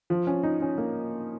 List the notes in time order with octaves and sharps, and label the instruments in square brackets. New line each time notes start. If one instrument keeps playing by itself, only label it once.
[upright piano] F3
C#4
D#4
C#4
A#3